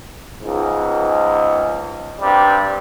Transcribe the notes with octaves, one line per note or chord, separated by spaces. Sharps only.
C#2 G#2
G2 C3 G3